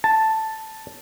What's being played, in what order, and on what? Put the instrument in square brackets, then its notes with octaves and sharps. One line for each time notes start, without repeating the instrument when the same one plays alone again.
[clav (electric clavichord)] A5